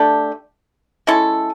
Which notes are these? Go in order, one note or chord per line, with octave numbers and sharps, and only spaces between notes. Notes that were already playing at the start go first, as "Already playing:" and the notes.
Already playing: A3 D4 G4
G#3 C#4 E4 A4